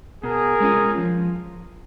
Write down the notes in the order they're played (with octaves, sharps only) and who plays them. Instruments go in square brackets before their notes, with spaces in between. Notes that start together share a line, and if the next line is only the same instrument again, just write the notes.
[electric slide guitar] B2 [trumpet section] G#4 A#4
[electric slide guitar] G#3 C#4 F4
F3